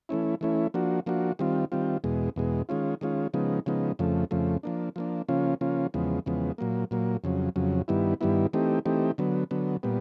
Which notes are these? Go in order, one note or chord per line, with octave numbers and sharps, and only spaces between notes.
E3 A3 C#4 E4
E3 A3 C#4 E4
F3 A#3 D4 F#4
F3 A#3 D4 F#4
D#3 G3 C4 F4
D#3 G3 C4 F4
E2 B2 G#3
E2 B2 G#3
D#3 G#3 C#4 F4
D#3 G#3 C#4 F4
C#3 F3 G#3 B3 D#4
C#3 F3 G#3 B3 D#4
F2 C#3 F3 A3
F2 C#3 F3 A3
F3 A#3 D4
F3 A#3 D4
C#3 F3 A#3 C#4 F4
C#3 F3 A#3 C#4 F4
E2 C#3 F3 G#3 B3
E2 C#3 F3 G#3 B3
A#2 F#3 A#3
A#2 F#3 A#3
F2 C#3 F#3
F2 C#3 F#3
G2 D#3 G3 B3 E4
G2 D#3 G3 B3 E4
E3 A3 C4 D#4 G4
E3 A3 C4 D#4 G4
D3 F#3 B3
D3 F#3 B3
A#2 G3 B3